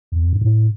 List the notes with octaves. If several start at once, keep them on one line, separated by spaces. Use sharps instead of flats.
E2
F2
G2
A2